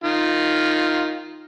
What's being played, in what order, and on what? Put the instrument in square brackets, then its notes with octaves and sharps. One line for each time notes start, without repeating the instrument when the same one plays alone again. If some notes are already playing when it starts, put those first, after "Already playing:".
[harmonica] D#3 F4